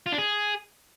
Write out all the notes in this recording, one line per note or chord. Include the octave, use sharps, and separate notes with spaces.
F4
D4
G#4